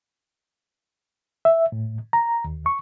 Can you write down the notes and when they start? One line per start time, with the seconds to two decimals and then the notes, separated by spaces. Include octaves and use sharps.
1.45 E5
1.72 A2
2.13 A#5
2.44 D#2
2.66 C#6